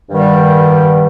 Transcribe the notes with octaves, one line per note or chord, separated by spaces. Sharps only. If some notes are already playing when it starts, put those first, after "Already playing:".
G2 D#3 G3 B3